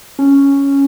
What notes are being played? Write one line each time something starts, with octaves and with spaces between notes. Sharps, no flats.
C#4